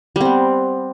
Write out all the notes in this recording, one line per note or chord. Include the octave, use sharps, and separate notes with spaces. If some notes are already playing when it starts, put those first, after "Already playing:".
G3 B3 C4